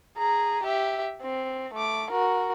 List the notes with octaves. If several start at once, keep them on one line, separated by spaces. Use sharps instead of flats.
G#4 A#5
G4 E5
C4
A3 D6
F#4 A#4